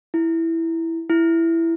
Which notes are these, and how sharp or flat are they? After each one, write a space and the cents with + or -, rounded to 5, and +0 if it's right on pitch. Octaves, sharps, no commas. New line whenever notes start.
E4 +0
E4 +10